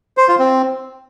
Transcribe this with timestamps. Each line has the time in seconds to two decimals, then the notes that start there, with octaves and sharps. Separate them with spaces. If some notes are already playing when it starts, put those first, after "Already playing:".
0.17 C5
0.28 F4
0.39 C4